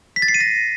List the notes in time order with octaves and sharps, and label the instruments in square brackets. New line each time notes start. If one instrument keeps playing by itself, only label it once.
[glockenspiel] B6
A6
C7
D#7
A#6